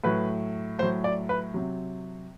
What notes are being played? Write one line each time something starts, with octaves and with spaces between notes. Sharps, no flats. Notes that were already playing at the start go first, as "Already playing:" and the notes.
A2 F#3 B4
A2 F#3 C5
D5
B4
C3 F#3